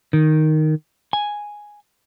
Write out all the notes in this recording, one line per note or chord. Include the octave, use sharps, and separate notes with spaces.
D#3
G#5